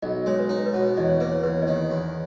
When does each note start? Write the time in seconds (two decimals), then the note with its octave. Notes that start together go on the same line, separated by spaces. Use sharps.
0.02 B1 D#5
0.26 G#3 C#5
0.39 B4
0.49 D#4 C#5
0.66 B4
0.74 B2
0.81 C#5
0.97 E2 D#5
1.09 C#5
1.20 A#3 B4
1.32 C#5
1.43 E2 B4
1.62 D#5
1.67 D#3 C#5
1.90 E2